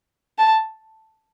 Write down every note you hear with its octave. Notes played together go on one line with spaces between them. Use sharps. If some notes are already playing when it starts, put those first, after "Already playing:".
A5